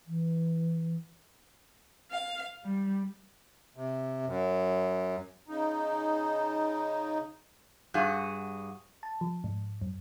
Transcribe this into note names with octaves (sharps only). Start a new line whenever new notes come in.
E3
F5
G3
C3
F#2
C#3 D#4
G2 F#4 G#4
A5
F3
G#2
F#2